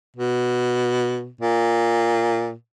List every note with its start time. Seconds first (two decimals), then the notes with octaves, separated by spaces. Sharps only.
0.17 B2
1.41 A#2